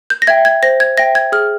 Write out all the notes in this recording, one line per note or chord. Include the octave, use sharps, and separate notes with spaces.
G6
A#6
E5 G5 G#6
G#6
C5 A#6
G#6
E5 G5 A#6
G#6
G#4 F6